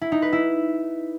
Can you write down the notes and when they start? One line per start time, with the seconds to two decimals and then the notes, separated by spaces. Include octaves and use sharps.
0.01 E4
0.12 D#4
0.22 B4
0.33 E4